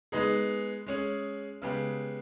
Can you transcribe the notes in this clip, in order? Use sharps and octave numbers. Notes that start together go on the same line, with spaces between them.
G#3 B3 D#4 G#4
G#3 C#4 G#4
C#3 G#3 B3 G4